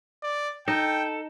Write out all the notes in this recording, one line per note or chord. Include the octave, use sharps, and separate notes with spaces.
D5
D#4 A4 G5